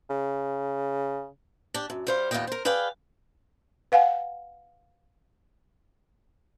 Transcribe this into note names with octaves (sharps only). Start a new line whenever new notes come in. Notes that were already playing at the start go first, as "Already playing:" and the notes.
C#3
D4 G4
F#2
G3 C5 F5
D#2 A#2 C#3 B3 D#5 G5
A#4 C5
G#4 B4 D5 F5 G5
B4 F5 F#5 G#5